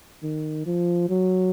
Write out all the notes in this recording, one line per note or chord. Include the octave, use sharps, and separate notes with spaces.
D#3
F3
F#3